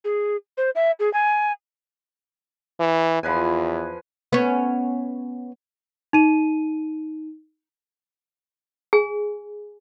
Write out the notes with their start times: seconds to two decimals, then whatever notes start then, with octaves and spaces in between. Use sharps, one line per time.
0.04 G#4
0.57 C5
0.75 E5
0.99 G#4
1.13 G#5
2.80 E3
3.23 E2 F3 B4 G#5
4.33 B3 C#4
6.13 D#4 D#7
8.93 G#4 G#5